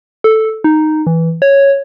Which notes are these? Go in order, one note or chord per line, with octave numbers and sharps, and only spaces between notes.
A4
D#4
E3
C#5